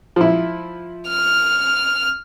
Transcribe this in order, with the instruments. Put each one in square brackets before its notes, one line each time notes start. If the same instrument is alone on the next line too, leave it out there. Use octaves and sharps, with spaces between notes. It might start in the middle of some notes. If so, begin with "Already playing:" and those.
[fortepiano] F3 E4
[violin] F6